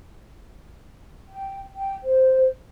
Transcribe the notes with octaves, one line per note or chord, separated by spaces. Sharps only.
G5
G5
C5